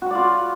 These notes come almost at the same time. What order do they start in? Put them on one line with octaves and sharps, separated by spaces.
F#4 F#5 D5 F4